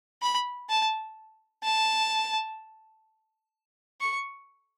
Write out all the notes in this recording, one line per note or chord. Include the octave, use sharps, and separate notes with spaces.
B5
A5
A5
C#6